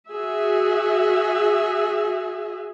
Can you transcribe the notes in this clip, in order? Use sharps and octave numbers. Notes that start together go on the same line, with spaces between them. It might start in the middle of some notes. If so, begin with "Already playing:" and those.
F#4 G#4 E5